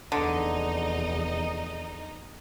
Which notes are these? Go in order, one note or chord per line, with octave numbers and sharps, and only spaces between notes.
F1 E2 D3 D#4 D#5